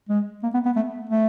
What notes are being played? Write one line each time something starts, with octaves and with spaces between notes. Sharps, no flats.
G#3
A#3
B3
B3
A3
A3